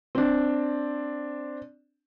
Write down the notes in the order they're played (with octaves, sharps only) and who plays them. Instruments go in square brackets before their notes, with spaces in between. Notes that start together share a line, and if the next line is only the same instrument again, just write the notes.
[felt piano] C4 D4